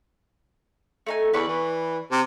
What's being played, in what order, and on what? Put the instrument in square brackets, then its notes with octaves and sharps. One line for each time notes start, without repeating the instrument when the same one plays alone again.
[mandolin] A3 D#4 G#5
[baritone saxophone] E2 [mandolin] B4 D5 C#6
[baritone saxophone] E3
C3